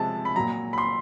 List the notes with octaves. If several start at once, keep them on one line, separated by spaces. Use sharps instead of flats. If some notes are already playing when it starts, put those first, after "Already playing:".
Already playing: C3 F3 G#3 A5
B5
A#2 F#3 A#5
B5
C6